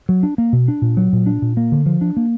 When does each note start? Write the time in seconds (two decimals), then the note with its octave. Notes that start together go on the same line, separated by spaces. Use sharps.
0.09 F#3
0.23 D4
0.38 A#3
0.53 B2
0.68 D4
0.82 A#2
0.97 F#3
1.13 A#2
1.26 D4
1.42 A#2
1.57 A#3
1.72 D3
1.86 F3
2.01 D4
2.17 A#3